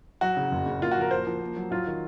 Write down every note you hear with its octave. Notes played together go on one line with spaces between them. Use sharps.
F#3 F#4
C#3
F#1
C#3
A#3 F4
F#4
F3 A#4
A#3 C5
F3
A#3
F#3
F#3 F4
D#3